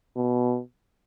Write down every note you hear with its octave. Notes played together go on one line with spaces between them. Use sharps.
B2